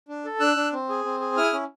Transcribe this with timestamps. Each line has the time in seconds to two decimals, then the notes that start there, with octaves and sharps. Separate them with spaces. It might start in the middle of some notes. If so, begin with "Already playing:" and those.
0.09 D4
0.25 A4
0.40 D4 E6 F#6
0.56 D4
0.73 C4
0.89 G#4
1.04 C4
1.20 G#4
1.37 E4 D#6 F6
1.53 C#4